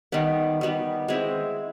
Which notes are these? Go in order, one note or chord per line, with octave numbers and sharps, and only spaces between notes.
D#3 G3 B3
D#3 G3 B3
G#3 C4 E4